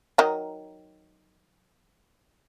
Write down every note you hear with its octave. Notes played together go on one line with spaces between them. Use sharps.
D#3 F#3 D#4